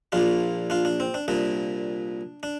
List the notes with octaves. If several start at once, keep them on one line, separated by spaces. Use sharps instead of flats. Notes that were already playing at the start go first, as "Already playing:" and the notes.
A#1 A#2 D4 F4
D4 F4
D4
C4
D4
C2 A#2 D4
D4